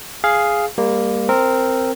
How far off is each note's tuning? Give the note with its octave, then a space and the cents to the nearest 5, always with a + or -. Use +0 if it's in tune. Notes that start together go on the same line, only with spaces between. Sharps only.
G#4 +0 F5 +0
G3 +35 A#3 +0
C4 +0 A#4 -10